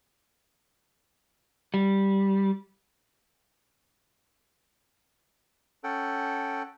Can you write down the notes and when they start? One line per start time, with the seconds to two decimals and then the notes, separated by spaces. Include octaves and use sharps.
1.74 G3
5.84 C#4 A4 F#5 G5